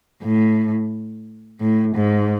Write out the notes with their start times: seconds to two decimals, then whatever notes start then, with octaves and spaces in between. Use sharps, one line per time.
0.23 A2
1.60 A2
1.95 G#2